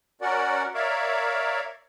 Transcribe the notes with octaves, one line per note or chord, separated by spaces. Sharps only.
C#4 F#4 A#4 D5 F#5
A#4 C#5 D5 E5 F5